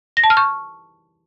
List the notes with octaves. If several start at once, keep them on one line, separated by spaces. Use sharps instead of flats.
A#6
A5
F6
C#6